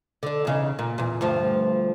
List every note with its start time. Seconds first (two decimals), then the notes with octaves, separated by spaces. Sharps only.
0.23 D3 D4
0.45 E2 C#3 D#4
0.79 A#2
0.98 E2 A#2
1.21 D2 G2 F3